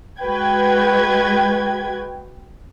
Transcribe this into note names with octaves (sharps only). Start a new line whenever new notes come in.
G#3 F#4 B4 G5 G#6